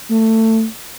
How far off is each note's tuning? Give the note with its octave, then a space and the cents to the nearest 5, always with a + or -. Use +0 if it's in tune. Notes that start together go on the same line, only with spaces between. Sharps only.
A3 +20